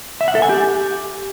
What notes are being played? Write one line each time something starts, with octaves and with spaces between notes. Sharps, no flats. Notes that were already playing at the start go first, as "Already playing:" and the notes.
E5
F#5
A4
G#5
G4